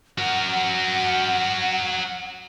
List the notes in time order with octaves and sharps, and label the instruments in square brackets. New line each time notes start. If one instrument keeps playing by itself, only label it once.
[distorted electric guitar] F#4 A#4 [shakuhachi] F#5